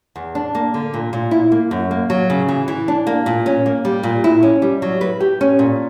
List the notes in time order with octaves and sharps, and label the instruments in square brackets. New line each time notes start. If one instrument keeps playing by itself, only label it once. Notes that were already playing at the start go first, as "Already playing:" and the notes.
[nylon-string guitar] E2
D4
A#3
D3
A#2
A#2
E4
A#3
F#2
A#3
F#3
C#3
E3
E3
D4
A#3
A#2
C#4
A#3
G3
A#2
E4
C#4
G3
F#3
B4
G4
C#4
A#2